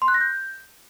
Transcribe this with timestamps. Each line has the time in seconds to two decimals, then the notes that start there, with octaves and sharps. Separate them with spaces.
0.02 C6
0.08 F#6
0.14 A#6
0.21 G6